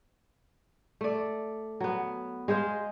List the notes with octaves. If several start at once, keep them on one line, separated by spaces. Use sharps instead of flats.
A3 D5
F#3 B3
G#3 G#4 C5 F5